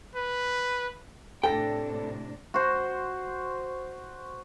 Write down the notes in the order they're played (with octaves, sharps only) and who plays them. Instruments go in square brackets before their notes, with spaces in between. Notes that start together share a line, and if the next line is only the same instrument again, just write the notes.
[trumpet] B4
[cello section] A2 C3 D4 [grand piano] A4 A#6 [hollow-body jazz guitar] G5
[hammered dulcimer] F#4 C5